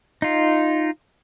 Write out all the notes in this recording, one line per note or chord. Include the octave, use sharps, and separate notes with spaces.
D#4 F4